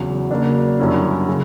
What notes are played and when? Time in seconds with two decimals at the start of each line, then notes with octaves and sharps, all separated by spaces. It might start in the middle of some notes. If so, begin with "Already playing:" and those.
Already playing: E2 C#3 F#3
0.31 C#3 F#3 A#3 D4
0.79 F#2 D3 G3 C#4 E4
1.28 C#3